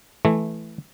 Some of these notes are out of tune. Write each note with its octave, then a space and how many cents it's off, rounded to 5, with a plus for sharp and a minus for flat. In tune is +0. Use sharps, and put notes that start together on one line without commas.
E3 +0 A3 -10